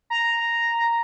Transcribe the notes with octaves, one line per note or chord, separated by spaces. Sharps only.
A#5